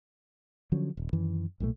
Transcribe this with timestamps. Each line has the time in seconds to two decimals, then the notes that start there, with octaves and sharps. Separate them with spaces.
0.72 D3 F3 F#3 C#4
0.97 D#1
1.13 F#2 D#3 E3
1.60 B1 A#2 G3 A3